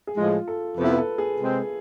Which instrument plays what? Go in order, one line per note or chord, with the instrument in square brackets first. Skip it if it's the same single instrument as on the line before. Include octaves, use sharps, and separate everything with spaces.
[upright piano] G#4
[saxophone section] A2 F3 G#3 [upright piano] F4
[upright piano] A4
[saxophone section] F2 C3 F3 B3 E4 [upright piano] B4
[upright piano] B4
A4
G#4
[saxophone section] C3 G#3 C4